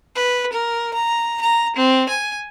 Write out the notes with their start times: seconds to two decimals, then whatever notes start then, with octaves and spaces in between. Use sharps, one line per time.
0.16 B4
0.53 A#4
0.94 A#5
1.41 A#5
1.76 C4
2.09 G#5